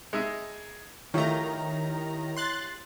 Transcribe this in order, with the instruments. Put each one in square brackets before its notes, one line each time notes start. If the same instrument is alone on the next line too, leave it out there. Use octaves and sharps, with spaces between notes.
[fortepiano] G#3 D#4 E5
[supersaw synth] D#3 A#5 [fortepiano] F3 A3 [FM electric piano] E4 G4 C#5
[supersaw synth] C6 F#6 A6